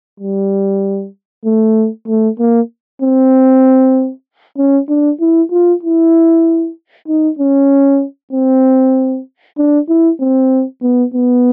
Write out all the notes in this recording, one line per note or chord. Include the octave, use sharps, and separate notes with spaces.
G3
A3
A3
A#3
C4
C#4
D4
E4
F4
E4
D#4
C#4
C4
D4
E4
C4
B3
B3